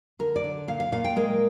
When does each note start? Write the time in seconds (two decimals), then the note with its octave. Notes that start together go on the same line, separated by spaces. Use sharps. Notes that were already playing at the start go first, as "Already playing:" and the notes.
0.19 D3 A#4
0.36 D5
0.44 D3
0.68 A#2 F5
0.80 F5
0.92 A#2 F5
1.04 G5
1.16 G#3 A#4